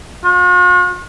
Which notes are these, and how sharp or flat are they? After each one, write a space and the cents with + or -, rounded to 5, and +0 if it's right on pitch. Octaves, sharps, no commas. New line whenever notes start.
F#4 -45